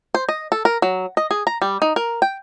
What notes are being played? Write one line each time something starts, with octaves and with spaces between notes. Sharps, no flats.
C5
D#5
A4
A#4
F#3
D#5
G#4
A#5
G3
D#4
A#4
G5